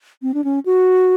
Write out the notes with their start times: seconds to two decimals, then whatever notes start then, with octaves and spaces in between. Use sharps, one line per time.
0.22 C4
0.34 D4
0.44 C#4
0.66 F#4